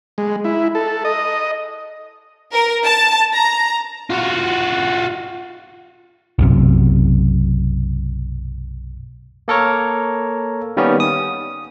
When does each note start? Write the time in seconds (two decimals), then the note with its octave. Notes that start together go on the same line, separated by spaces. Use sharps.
0.18 G#3
0.44 E4
0.75 A4
1.05 D#5
2.53 A#4
2.84 A5
3.34 A#5
4.10 F4 F#4
6.39 B1 F#2 C3
9.48 A#3 A4 A#4 C#5
10.77 D#3 G3 A#3 B3 C#4
11.00 D#6